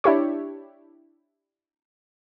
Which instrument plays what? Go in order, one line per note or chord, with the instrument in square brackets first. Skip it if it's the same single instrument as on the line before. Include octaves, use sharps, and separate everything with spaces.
[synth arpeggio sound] D4 E4 G4 C#5